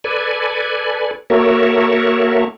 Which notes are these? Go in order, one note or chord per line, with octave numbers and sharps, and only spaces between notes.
A4 B4 D5 G#5
A#3 F#4 A4 A#4 C#5 E5